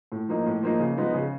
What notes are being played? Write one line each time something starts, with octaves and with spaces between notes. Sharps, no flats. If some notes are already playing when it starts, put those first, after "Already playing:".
A2
F3 A#3 D#4
A2
F3 A#3 D#4
C#3
F3 G#3 B3 D#4
C#3